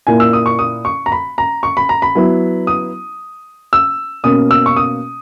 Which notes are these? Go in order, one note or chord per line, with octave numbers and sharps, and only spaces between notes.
A#2 A#3 E4 G#5
E6
D#6
C#6
D#6
C#6
A#5
B5
A#5
C#6
B5
A#5
B5
F#3 B3 E4
D#6
E6
B2 A#3 C#4 D#6
E6
C#6
D#6